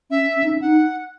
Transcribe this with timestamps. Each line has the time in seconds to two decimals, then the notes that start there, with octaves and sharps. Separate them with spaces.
0.10 C#4 E5
0.36 C#4
0.44 D#4
0.52 C#4
0.61 D#4 F#5